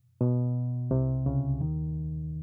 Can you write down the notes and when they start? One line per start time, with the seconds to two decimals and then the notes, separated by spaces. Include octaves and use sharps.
0.21 B2
0.91 C2 C3
1.26 C#2 C#3
1.60 D#2 D#3